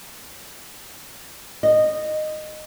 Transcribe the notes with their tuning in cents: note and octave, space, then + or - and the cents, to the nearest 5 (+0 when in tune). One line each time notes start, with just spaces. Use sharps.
D#5 -15